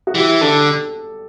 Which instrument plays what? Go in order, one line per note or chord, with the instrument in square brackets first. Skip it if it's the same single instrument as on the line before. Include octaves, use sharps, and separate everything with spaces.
[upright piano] F#4
[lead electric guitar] E3 [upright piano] G4
[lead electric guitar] D3 [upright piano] A4